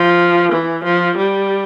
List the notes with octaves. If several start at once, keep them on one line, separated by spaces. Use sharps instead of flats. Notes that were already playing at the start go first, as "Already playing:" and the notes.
Already playing: F3
E3
F3
G3